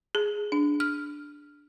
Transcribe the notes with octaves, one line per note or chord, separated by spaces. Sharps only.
G#4
D4
F6